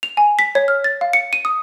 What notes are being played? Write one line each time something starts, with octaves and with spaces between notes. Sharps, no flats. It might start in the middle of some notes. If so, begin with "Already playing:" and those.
F7
G#5
B6
C#5
F6
A6
F5
C#7
D#7
D#6